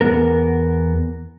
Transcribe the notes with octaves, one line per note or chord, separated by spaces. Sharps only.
E2 B3 A#4